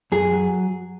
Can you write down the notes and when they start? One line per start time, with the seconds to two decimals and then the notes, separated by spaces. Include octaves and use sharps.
0.12 F#2 G#4
0.31 F#3